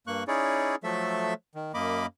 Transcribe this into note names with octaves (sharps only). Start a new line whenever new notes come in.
G2 A#3 C#6 F#6
C#4 D#4 E4 G#4 C#5 D5
F3 F#3 A3 A4 E5
D#3
F#2 A#3 D#5 B5 D6